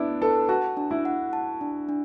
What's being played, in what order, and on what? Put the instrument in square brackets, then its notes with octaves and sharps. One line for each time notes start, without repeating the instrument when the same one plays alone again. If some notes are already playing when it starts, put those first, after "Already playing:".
Already playing: [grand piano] B3 D4 E4
[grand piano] A4 [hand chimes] B4
[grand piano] F#4 [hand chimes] A5
[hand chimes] D4
[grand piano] E4
[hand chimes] F#5
A5
D4
D4